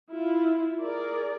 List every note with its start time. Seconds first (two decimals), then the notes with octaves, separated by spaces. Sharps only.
0.10 E4 F4
0.79 G#4 A#4 D5